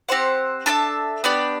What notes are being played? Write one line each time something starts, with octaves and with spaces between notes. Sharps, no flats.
C4 G4 C5 F#5
D4 A4 E5 A5
B3 D4 G4 D5